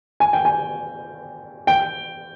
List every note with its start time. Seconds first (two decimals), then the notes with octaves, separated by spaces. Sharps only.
0.20 G#5
0.33 G5
0.45 G#5
1.67 G5